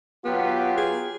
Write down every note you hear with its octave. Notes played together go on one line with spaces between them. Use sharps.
F#3 B3 F4 G4
G#4